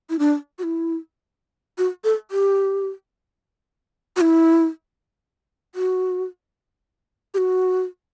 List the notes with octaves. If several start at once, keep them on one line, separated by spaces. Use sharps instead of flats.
E4
D4
F#4
E4
F#4
A4
G4
F#4
E4
F#4
G4
F#4